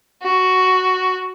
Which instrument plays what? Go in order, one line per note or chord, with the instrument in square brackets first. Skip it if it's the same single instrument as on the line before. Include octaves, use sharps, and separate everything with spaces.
[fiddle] F#4